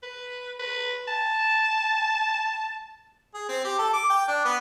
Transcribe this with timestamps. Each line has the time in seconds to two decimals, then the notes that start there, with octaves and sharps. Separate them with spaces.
0.03 B4
0.59 B4
1.08 A5
3.34 G#4
3.49 C4
3.65 G4
3.79 A4
3.93 D6
4.10 G5
4.28 D4
4.45 B3